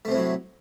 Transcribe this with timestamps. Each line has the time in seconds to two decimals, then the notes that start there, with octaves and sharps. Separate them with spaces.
0.05 A3
0.08 C3
0.11 C4
0.14 A2
0.17 F#3